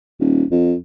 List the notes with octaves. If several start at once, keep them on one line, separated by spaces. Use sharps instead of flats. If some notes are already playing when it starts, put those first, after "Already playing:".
D#1
F2